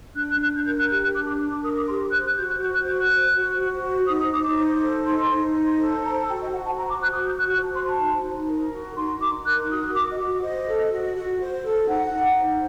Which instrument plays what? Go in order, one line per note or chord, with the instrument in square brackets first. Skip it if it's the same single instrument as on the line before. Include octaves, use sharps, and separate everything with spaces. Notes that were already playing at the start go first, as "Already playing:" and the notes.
[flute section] D4 F#6
F#6
D4 F#6
G6
A#4 G6
F#6
G4 F#6
F#6
D4 D6
D6
D4
D6
A#4 D#6
D6
G4 C6
C5 F#6
F#6
F#4 G6
F#6
F#4 G6
F#6
C5 G6
F#6
C5
F#4
F#4
C5
D#4 D#6
D#6
D#4 D6
D6
C5
A4
D#4 C6
D#4
C5
A4
C5 A#5
A5
F#4 G5
D#5
F#4 F#5
A5
C5 A#5
D6
C5 F#6
D#6
F#4 G6
F#6
F#4 F#6
A5
C5 C6
A5
D#4
D#4
A#4
F#4
D#4 C6
D#4 D6
A#4 F#6
F#4 D#6
F#4 D6
D#5
F#4
C5 D#5
A4
F#4
F#4
C5
A4
D#4 F#5
D#4
C5